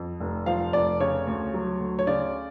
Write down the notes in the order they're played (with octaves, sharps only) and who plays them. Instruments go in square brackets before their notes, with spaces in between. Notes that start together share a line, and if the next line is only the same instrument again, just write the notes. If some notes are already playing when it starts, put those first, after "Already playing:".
Already playing: [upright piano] F2
F1
F3 F5
F1 D5
C#3 C#5
D2
F#3
D2
C#5
C#3 D5